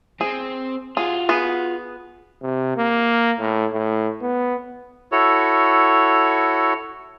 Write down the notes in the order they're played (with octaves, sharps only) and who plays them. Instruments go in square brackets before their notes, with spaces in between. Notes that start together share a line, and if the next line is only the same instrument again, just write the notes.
[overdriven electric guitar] C4 [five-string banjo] G#4
[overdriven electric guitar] F4 F#4 [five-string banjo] G#4
[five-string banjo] B3 G#4
[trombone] C3
A#3
A2
A2
B3
[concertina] E4 F#4 A4 C#5